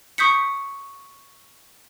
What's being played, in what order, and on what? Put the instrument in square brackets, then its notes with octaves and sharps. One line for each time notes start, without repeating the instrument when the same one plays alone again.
[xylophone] C#6 D#6 G6 B6 C#7